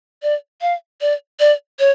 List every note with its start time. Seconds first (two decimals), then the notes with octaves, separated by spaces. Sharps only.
0.23 D5
0.62 F5
1.01 D5
1.40 D5
1.79 C#5